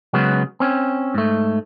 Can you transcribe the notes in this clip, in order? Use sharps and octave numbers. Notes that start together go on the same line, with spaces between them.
C#3 F#3 G#3 B3 C#4
C4 C#4
G#2 A3